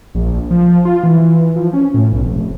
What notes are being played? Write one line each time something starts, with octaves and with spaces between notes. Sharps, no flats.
A#1
F3
F4
E3
F3
C#4
A2
B1
F1